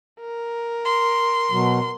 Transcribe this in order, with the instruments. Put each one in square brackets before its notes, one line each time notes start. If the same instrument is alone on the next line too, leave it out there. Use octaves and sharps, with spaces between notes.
[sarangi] A#4
[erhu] C6
[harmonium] B2 F#3